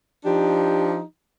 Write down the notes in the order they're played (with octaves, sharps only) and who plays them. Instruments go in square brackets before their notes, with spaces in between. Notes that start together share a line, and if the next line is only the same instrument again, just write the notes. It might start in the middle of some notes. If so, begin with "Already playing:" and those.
[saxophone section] F3 D4 D#4 G4